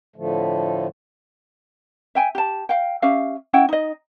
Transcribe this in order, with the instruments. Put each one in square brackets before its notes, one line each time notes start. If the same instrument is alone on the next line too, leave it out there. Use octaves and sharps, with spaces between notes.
[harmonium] A2 D3 F3 A3
[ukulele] E5 G5 G#5
G4 A5
F5 G5
C#4 G4 E5 F5
C#4 E4 F#5 G5
D#4 D#5